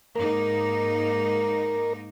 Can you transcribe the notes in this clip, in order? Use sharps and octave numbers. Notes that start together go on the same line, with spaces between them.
G#2 A#3 D#4 A#4